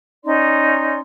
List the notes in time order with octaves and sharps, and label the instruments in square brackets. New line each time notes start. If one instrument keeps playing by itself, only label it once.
[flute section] C#4 D#4 D5 C6